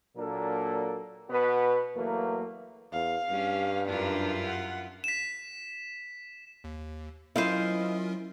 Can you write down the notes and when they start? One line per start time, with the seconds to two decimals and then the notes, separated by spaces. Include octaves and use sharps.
0.16 A#2 F#3 A#3 D4 A4 A#4
1.29 B2 B3 F#4 B4
1.95 E2 F#3 A3 A#3
2.92 E2 F5
3.30 G2 G3 C#4
3.88 F#2 D4 E4 F4 A#4
4.46 F#5
5.04 B6 E7
6.64 D#2
7.36 F#3 C#4 E4 F4 A#4 C5 D#5 F5